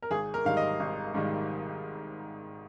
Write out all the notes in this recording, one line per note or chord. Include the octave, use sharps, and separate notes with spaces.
A#4
G#1 G#4
A#4
G#2 D#3 G3 F5
D#5
G#1
G#2 D#3 G3